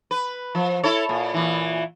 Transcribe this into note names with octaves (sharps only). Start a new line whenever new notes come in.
B4
F3
E4 A4 C#5
A#2
A#2 E3